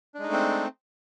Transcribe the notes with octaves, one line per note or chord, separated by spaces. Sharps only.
G#3 A3 C4 D4 D#4